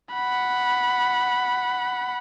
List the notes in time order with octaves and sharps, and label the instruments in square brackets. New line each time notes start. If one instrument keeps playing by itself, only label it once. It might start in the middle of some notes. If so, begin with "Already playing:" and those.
[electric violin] F#5 B5